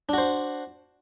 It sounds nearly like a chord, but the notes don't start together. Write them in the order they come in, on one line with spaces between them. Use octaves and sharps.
D4 F#4 C5